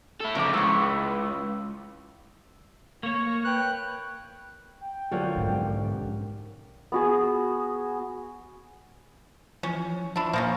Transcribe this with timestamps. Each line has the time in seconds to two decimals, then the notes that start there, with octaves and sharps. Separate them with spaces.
0.21 E4 A4
0.35 C#3 F3 A#4 D6
0.53 C#2 E4 C#6
3.03 A#3 C#5 C#6
3.44 B4 G5 F#6
4.81 G5
5.11 D3 F3 F#3 C#4 G4 A#4
5.36 B1 G#2
6.92 B3 F#4 G#4
9.63 E3 F3 C#4
10.16 F3 D4 E4
10.33 A#2 F3 A#3 C#4